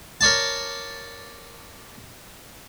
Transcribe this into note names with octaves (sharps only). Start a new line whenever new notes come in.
A#4 C#5 D5 A5